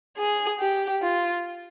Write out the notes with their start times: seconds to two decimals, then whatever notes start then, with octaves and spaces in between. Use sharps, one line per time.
0.18 G#4
0.60 G4
1.02 F4